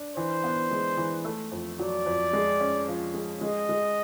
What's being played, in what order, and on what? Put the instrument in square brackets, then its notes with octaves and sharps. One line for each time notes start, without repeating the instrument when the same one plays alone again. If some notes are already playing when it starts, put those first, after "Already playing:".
Already playing: [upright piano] D4
[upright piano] E3 [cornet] C5
[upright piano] B3
G#3
E3
A3
F2
[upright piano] F#3 [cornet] D5
[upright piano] F2
G#3
C#4
F3
G#3
[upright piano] G#3 [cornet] D#5
[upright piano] G#3